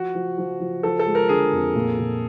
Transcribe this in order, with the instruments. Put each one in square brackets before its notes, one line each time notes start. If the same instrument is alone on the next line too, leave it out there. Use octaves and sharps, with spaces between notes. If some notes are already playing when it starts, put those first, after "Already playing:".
Already playing: [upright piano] F3 [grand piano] F#4
[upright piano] F3
F3
F3
[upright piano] F3 [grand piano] A4
[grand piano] A4
[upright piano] G#3
[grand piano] A#4
[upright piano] D3 [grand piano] G#4
[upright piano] F2
A#2
A#2